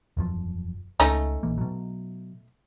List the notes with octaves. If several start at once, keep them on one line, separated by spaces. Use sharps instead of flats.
E1 F#2 F3
C#2 A3 C#4 D#4
A#1 E3 A#3
B2 F#3